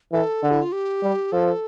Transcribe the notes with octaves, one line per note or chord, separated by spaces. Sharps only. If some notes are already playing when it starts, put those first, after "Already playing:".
E3 A4
D3
E4
F4
G4
G3
F3 A4